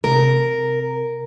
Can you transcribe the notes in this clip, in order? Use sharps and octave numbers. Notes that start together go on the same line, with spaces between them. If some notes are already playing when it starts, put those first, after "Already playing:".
C3 A#4